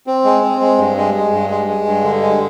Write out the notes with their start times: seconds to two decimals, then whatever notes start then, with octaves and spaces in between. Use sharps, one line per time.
0.07 C4
0.25 G#3
0.42 C4
0.61 G#3
0.78 G2
0.97 G#3
1.14 G#3
1.32 G2
1.50 G#3
1.68 G#3
1.86 G2
2.04 D3
2.22 G#3